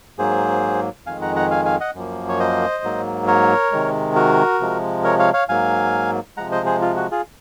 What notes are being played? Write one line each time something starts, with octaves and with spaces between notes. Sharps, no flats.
G#2 F#3 A#3 G#4 C5
F2 D#3 G#3 F5 G#5
F#5 A#5
F#5 A#5
F5 G#5
F5 G#5
D#5 F#5
F#2 F3 A#3
C#5
C5 D#5
G#2 F#3 A#3
A#4 C#5
C3 D#3 G#3
F#4 A#4
C3 F3 G#3
A#4 C#5
C#5 F5
C#5 F5
G#2 F#3 A#3 F5 G#5
C3 F3 G#3 F#5 A#5
C5 D#5
G#4 C5
F4
F#4
F4 G#4